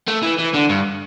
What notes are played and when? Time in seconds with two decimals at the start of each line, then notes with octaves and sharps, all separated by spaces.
0.08 A3
0.23 E3
0.39 E3
0.54 D3
0.69 G2